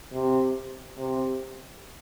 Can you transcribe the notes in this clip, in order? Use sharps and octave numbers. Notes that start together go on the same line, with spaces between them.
C3
C3